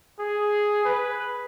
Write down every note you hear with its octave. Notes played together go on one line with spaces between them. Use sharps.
G#4
B4